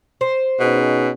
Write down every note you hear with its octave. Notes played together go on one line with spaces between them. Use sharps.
C5
B2 C#4 D#4 G#4